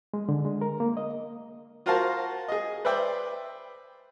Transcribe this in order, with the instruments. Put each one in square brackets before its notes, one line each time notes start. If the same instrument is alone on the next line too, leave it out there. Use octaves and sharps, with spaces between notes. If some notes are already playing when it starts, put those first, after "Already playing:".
[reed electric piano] G#3
D3
G#3
A#4
A#3
D#5
[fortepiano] F4 F#4 A#4 C5 F5 A5
G#4 D#5
B4 C5 D5 E5 G5